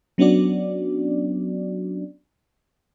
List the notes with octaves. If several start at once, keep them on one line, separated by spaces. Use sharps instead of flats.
F#3 B3 C#4 D4 F#4 D5